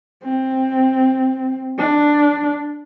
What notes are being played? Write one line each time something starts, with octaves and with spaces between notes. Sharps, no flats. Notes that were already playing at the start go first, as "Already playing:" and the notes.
C4
D4